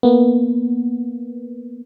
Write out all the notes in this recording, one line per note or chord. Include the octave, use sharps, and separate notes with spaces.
A#3 B3